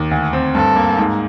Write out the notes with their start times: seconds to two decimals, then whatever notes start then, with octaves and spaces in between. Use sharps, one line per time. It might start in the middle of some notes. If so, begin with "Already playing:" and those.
Already playing: D#2
0.11 D2
0.33 C4
0.55 G2 A4
0.76 A#3
0.97 G#2